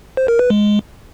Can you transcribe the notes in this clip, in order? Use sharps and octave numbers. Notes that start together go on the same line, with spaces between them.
C5
A#4
B4
G#3